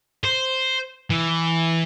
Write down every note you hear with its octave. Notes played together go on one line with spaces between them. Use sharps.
C5
E3